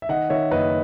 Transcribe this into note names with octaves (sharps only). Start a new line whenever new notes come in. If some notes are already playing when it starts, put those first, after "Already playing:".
E5
D#3 D#5 F#5
D#3 C#5 E5
F#1 B4 D#5